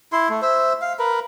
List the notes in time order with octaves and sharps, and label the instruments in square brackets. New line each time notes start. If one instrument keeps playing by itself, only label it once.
[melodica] E4 C6
A3
C5 E5
F5
A#4 B4